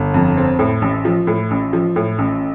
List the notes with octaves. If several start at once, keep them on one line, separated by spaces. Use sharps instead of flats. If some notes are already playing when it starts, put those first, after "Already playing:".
Already playing: G1
F2
C4
A2
A1
F3
A2
A1
F3
A2
A1